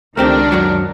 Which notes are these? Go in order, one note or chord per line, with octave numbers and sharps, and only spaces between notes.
C#2 D#3 A3 C4 D4 G4 A#4
F#2 F#3